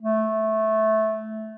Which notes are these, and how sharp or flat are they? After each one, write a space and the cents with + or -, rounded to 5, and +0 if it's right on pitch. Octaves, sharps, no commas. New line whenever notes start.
A3 -10